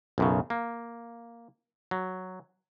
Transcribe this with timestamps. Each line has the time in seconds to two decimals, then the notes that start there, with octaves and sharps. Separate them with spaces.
0.18 B1 F#2 C#3
0.50 A#3
1.91 F#3